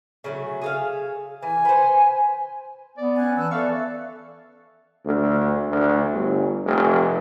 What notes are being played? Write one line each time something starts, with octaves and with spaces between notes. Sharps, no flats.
C#3 F#3 A3
G#4 A4 F5
E3 G#5
B4 C5
B3 D5
C#4 G#5 F#6
E3 A5 E6 F#6
A4 D5 E5 F5 C#6
D2
D2
G1
F1